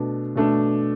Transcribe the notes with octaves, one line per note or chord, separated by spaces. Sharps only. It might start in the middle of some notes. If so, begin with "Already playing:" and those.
Already playing: B2 A3 D4
B2 A3 D4